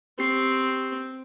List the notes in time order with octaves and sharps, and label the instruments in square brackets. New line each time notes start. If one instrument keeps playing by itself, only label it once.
[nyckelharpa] C4 [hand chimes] G4 C7